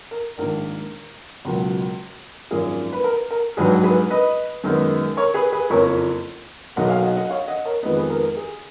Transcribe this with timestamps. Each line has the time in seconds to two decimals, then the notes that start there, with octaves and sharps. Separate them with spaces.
0.11 A#4
0.38 A#1 G#2 D#3 A#3 A#4
1.45 C#2 B2 F#3 A#3
2.51 G#1 F#2 F3 A#3 G#4
2.93 B4
3.04 A#4
3.31 A#4
3.57 A#1 G#2 F#3 G#4 B4
3.84 G#4 B4
4.11 B4 D#5
4.64 F#2 D#3 G#3 B3
5.17 A#4 C#5
5.34 G#4 B4
5.52 G#4 B4
5.70 F#1 F2 F3 A#3 A#4 C#5
6.76 B1 B2 F#3 A#3 D#5 F#5
6.90 F5 G#5
7.03 D#5 F#5
7.16 D#5 F#5
7.30 C#5 F5
7.48 D#5 F#5
7.65 A#4 C#5
7.83 F2 D#3 G#3 B3 B4 D#5
7.97 G#4 B4
8.10 A#4
8.23 A#4
8.37 G#4